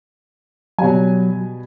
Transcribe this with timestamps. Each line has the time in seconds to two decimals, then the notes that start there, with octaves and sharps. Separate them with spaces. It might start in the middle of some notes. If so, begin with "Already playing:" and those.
0.79 B2 F#3 G3 G#5